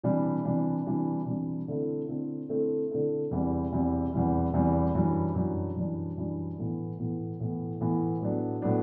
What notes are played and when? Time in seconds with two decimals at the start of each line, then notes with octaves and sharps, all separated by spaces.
0.03 C3 E3 G3 D4
0.45 C3 E3 G3 D4
0.86 C3 E3 G3 D4
1.26 C3 E3 G3 D4
1.68 D3 A3 C4 E4 A4
2.08 D3 A3 C4 E4 A4
2.49 D3 A3 C4 E4 A4
2.90 D3 A3 C4 E4 A4
3.31 E2 C3 E3 G3
3.72 E2 C3 E3 G3
4.13 E2 C3 E3 G3
4.53 E2 C3 E3 G3
4.95 F#2 E3 G3 D4
5.35 F#2 E3 G3 D4
5.76 F#2 E3 G3 D4
6.17 F#2 E3 G3 D4
6.58 A2 E3 B3
6.99 A2 E3 B3
7.40 A2 E3 B3
7.81 A2 E3 B3
8.21 A2 F#3 B3 D4
8.62 A2 F#3 B3 D4